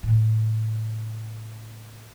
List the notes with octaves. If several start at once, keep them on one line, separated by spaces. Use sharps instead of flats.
A2 C#3